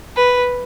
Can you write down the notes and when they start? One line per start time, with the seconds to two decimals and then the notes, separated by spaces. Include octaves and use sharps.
0.16 B4